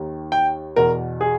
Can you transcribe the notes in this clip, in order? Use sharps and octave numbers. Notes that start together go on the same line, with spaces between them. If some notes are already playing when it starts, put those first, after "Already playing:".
Already playing: D#2 D#3
G5
E2 B2 A#4
G#4